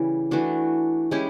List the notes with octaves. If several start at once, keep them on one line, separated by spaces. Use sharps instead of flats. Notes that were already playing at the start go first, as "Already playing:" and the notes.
Already playing: C#3 E3 G3
E3 A3 D4 F#4
G#3 C#4 E4 G4